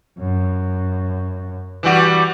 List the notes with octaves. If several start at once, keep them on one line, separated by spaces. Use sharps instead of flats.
F#2
E3 G3 F#4